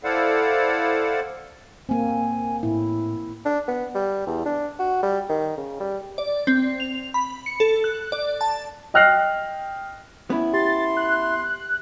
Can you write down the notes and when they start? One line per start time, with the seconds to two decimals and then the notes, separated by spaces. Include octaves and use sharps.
0.04 E4 A4 C5 D5 F5 F#5
1.89 A#3 C4 G#5
2.63 A2 E4
3.45 D4
3.68 B3
3.95 G3
4.27 E2
4.46 D4
4.80 F#4
5.03 G3
5.29 D#3
5.57 C#3
5.80 G3
6.18 D5
6.47 C4
6.80 F7
7.14 B5
7.46 C#7
7.60 A4
7.84 F#6
8.12 D5
8.41 A5
8.94 D#5 G5 F6 F#6 A#6 C7
10.30 B3 C#4 E4
10.53 G4 C6 A6
10.97 F#6